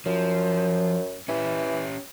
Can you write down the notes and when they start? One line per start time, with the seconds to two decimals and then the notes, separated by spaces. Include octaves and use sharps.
0.06 F#2 F3
1.28 E3 C#4 G4